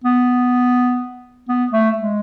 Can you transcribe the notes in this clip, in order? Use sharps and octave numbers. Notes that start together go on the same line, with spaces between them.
B3
B3
A3
G#3